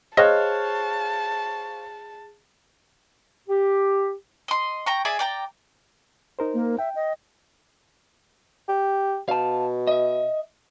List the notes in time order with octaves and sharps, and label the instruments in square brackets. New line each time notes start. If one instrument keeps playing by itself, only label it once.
[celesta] G#4 F6 F#6 [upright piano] C5 C#5 F5 [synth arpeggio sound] D#5 [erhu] A5
[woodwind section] G4
[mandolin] D#5 C6
G5 A#5 C#6
G#4 D5 E5 G#5
D5 G5 A#5
[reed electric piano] D#4 A#4 C5
[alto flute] A#3
[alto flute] E5 [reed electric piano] G5
[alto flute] D#5
[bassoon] G4
[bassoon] B2 [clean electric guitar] F5 A5
[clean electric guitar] D#5 E5